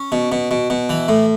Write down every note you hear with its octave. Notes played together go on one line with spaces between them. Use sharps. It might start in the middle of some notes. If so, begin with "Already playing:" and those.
Already playing: C#4
B2
B2
B2
B2
E3
A2